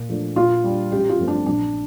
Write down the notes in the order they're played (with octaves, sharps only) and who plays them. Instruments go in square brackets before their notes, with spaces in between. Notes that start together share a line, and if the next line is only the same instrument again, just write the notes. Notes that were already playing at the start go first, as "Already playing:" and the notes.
Already playing: [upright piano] A#2
F3 A3 D4
[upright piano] A#2 [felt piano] F4
[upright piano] G3 D4
[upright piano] A1 [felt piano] G4
[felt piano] F4
[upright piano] G2 F3 A3 C4
[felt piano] D4
[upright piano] A#1 [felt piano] D4